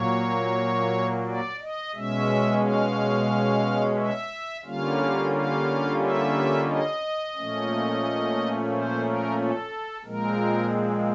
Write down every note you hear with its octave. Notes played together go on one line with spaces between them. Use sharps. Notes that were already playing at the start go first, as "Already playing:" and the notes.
Already playing: A#2 F#3 A#3 C#5
D5
D#5
B2 G#3 C#4 E5
F5
E5
D3 G3 A#3 C#4 F4 F5
F5
E5
D#5
A#2 F3 A3 C#4
C5
A#4
A4
A#2 F3 G#3 C4 A#4